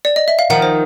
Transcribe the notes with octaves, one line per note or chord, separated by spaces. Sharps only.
D5
D#5
E5
F5
D#3 F3 F#5
C5